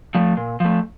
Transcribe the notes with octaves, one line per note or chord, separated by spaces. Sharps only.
F3 A3
A#2
F3 A3